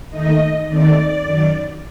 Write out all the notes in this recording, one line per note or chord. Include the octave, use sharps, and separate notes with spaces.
D#2 D#3 A3 D#4 D#5
D#2 D#3 A3 C4 D#4 D5
F#2 D#3 F#3